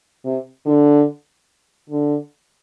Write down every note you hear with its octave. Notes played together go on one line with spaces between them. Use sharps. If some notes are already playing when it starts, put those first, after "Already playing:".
C3
D3
D3